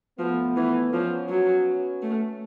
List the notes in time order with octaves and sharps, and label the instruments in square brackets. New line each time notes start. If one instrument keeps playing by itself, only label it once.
[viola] F3 [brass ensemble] A3 B3
[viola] E3
[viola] F3 [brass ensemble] B3 C#4
[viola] F#3
A3